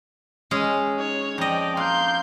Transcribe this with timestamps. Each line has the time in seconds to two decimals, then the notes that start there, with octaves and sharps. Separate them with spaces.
0.51 G#3 C#4 G#4
0.99 D#4 C#5
1.38 F2 D5 D#5 G5
1.77 A#3 C6 G6